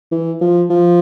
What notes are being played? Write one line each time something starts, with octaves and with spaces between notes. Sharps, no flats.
E3
F3
F3